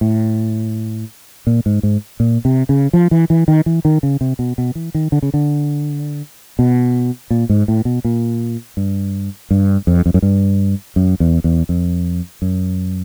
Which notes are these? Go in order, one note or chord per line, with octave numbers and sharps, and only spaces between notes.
A2
A#2
G#2
G#2
A#2
C3
C#3
F3
E3
E3
D#3
E3
D#3
C#3
C3
B2
B2
E3
D#3
D3
C#3
D3
B2
A#2
G#2
A2
B2
A#2
G2
G2
F2
F2
F#2
G2
F#2
E2
E2
F2
F#2